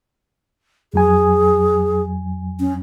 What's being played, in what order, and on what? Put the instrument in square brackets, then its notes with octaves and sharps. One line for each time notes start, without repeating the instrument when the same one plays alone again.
[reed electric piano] F2 F#3 G#5 [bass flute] G#4
[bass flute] C#4